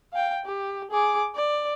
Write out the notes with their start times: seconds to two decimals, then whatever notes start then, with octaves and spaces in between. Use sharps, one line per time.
0.13 F5 G5
0.45 G4
0.91 G#4 D6
1.35 D5